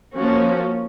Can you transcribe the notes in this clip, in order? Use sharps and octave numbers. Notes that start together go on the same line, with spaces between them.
F3 A#3 C#4 F#4